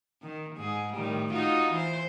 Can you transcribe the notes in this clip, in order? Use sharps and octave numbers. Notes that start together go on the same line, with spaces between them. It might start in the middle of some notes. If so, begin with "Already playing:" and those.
D#3
G#2 G#4
A2 D#3 G3
D#4 F4 F#4
E3 C5